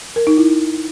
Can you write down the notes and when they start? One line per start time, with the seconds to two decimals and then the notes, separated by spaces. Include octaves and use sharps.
0.16 A#4
0.27 D#4
0.38 E4